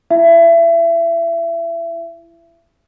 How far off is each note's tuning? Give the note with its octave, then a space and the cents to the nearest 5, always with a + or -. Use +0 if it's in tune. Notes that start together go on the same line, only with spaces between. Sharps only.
E4 +30 E5 +30